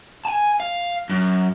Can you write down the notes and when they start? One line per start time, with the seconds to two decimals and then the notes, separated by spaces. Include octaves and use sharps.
0.25 G#5 A5
0.60 F5
1.09 F#2